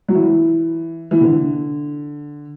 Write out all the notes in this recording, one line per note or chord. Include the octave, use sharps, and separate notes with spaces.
F#3
E3
E3
D3